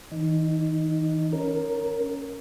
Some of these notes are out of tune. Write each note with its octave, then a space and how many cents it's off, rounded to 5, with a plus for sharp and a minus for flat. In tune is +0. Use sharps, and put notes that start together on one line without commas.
E3 -45 D#4 +0
C#4 +5 A#4 +0